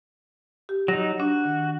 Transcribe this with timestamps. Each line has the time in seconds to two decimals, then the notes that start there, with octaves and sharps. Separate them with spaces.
0.69 G4
0.88 F#3 D#4 A#6
1.20 D4 F#4
1.45 D#3